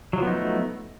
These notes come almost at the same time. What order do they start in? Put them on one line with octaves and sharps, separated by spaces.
F#3 F3 B3 D#4 A3